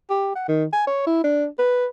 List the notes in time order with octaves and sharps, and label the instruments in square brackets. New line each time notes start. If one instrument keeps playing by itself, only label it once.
[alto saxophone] G4
F#5
D#3
G#5
C#5
E4
D4
B4